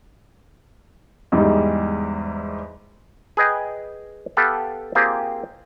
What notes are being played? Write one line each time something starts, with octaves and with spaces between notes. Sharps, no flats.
E2 G#2 G3 D#4
G#4 B4 D#5 G5 G#5
B3 G4 A4 B4 F5
A#3 C4 F4 G4 G#4 C5